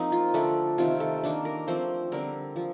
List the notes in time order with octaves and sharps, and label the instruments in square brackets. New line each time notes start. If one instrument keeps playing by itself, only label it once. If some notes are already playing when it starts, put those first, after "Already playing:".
Already playing: [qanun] F3 A#3 C4 D#4 A#4
F4
D3 A3 D4 A4
C3 D#3 A3 F4
A4
D#3 A#3 D4
A#4
F3 A3 C4 C5
D3 G3 C4 A#4
F3